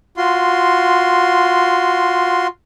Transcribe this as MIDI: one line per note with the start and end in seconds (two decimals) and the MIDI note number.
0.17 2.47 65
0.17 2.47 66
0.17 2.47 84